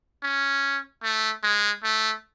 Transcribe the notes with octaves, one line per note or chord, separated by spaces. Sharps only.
C#4
A3
G#3
A3